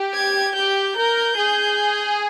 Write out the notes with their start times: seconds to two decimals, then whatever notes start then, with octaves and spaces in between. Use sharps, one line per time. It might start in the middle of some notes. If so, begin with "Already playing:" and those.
Already playing: G4
0.14 G#6
0.55 G4 G6
0.96 A#4 G6
1.37 G#4